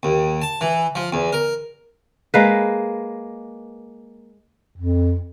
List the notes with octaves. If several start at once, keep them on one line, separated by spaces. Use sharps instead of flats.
D#2
A5
E3
F3
E2
A#4
G#3 A#3 B4
F2